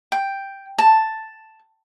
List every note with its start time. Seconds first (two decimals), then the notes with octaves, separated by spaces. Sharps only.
0.12 G5
0.78 A5